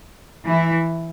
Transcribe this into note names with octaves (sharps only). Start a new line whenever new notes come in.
E3 E4